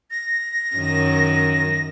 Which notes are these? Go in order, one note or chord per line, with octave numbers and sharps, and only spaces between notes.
A#6
F#2 D#3